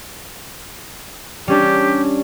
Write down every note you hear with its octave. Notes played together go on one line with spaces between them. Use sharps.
G3 C#4 D4 G4